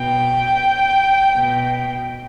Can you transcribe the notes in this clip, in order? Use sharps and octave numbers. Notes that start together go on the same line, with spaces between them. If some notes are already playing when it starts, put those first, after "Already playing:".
Already playing: B2 G5
B2